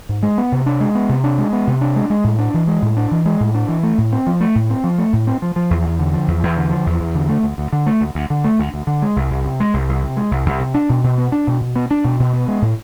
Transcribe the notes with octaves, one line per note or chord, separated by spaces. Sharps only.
G#2
G#3
B3
C3
D4
G#3
B3
C3
D4
G#3
B3
C3
D4
G#3
G#3
A2
D4
E3
G#3
A2
D4
E3
G#3
A2
D4
E3
A3
A2
C4
F3
A3
A2
C4
F3
A3
A2
C4
F3
F3
E2
E2
D3
F3
E2
E2
D3
F3
E2
E2
D3
A3
D2
D2
D3
A3
D2
D2
D3
A3
D2
D2
D3
G#3
C2
C2
C3
G#3
C2
C2
C3
G#3
C2
C2
C3
D4
B2
B2
B3
D4
B2
B2
B3
D4
B2
B2
B3
G#3
A2